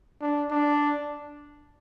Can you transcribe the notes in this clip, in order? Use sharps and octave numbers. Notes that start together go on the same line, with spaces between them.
D4
D4